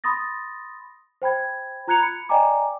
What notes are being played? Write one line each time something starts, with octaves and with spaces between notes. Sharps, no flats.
B5 C6 D#6 A6 A#6
C5 G5 B5 G#6
F4 A#5 F#6 G#6 C#7 F7
B5 C#7
D5 D#5 G5 G#5 A#5 D6